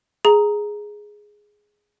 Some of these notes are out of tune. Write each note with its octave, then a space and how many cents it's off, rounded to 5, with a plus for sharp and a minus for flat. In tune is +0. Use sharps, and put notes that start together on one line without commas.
G#4 +0 A#5 +0